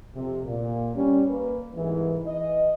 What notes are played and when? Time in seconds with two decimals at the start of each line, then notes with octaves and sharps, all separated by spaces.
0.15 F2 C3
0.45 A#2
0.95 G3 C#4
1.29 A#3 B4
1.75 C2 G#2 E3
2.27 E3 D#5